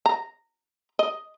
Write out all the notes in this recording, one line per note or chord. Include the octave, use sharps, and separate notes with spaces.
A#5
D#5